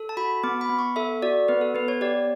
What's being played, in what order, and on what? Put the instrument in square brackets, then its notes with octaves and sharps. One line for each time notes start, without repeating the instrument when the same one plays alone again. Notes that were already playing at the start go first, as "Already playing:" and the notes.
Already playing: [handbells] A4
A5
F#4 B5
B3 D6
B5
B3
C#6
A4 E5
F#4 D5
B3 B4
A4
B3 B4
C#5
G4 D5